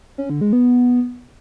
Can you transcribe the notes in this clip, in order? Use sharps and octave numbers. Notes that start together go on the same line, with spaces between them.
C#4
D3
G#3
B3